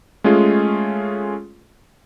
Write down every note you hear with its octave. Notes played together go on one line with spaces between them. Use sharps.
G#3 A3 C#4 F4 G#4